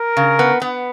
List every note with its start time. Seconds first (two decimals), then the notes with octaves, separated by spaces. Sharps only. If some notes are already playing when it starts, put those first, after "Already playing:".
Already playing: A#4
0.17 C#3
0.39 B3
0.62 B3